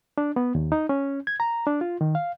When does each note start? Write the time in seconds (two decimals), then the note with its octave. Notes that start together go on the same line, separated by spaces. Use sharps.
0.18 D4
0.36 B3
0.55 D#2
0.72 D#4
0.89 C#4
1.27 G#6
1.40 A#5
1.67 D4
1.81 F4
2.01 D#3
2.15 F5